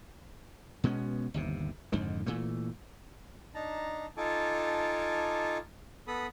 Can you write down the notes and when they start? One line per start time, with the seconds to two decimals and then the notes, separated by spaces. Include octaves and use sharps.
0.84 B2 G#3 B3 C#4
1.34 G1 D#2 C3
1.92 F2 G#2 D3 D#3
2.26 A#2 E3 A3
3.55 D4 D#4 A5 A#5
4.17 D#4 F4 A4 G#5 A5 D6
6.07 B3 A4 B5 D#6